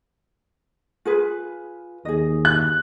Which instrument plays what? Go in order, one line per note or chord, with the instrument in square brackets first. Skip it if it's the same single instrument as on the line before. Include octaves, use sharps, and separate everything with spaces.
[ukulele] F4 G#4 B4
[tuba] D#2 [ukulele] G#4 D#5
[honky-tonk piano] F#6